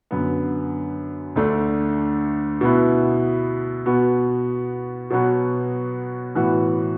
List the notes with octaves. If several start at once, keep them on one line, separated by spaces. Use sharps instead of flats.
F#2 D3 B3
D2 D3 A3 D4
B2 B3 E4
B2 B3 F#4
B2 F#3 B3 F#4
A2 E3 B3 F#4